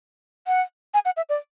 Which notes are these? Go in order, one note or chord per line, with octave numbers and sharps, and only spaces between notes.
F#5
G#5
F#5
E5
D5